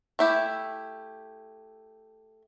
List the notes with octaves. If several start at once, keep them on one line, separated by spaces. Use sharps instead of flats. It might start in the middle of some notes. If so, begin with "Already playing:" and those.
A3 E4 G4